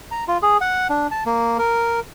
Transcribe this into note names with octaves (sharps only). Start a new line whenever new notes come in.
A#5
F4
G#4
F#5
D4
A5
A#3
A#4